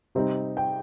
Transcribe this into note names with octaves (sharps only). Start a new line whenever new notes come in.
C3 G3 C4 D#4
G5